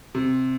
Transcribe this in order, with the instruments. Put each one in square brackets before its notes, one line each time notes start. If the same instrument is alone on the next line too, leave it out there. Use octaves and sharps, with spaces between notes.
[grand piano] C3